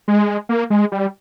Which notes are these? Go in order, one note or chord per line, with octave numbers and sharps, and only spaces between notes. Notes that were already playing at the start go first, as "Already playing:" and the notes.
G#3
A#3
G#3
G3